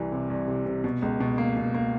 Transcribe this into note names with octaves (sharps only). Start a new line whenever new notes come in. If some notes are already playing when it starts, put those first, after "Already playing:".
Already playing: C2 E3
C3
C2
C3
C3
B2
C#2
B2
A#3
B2
A#3